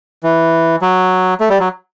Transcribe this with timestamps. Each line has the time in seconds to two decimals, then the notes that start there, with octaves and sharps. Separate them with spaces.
0.23 E3
0.81 F#3
1.40 A3
1.50 G3
1.60 F#3